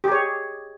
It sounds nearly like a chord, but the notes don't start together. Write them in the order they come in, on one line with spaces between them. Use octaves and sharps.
G4 G#4 C#5